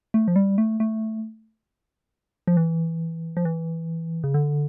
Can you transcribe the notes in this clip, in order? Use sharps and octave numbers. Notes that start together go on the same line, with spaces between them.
A3
F3
G3
A3
A3
F3
E3
F3
E3
C#3
D3